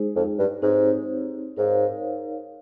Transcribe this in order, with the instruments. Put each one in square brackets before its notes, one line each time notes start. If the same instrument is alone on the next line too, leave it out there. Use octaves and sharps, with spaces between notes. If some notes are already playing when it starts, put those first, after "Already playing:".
Already playing: [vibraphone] G#3 D#4 G#4 C5
[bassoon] F2
G2
[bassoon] G#2 [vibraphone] C4 D#4 G4 C#5
[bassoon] G#2 [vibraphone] D#4 A#4 C#5 F5